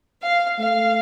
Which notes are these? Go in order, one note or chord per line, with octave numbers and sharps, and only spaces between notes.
F5
A3 F5